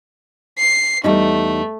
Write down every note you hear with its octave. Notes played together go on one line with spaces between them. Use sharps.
C7
E2 G3 A3 D#4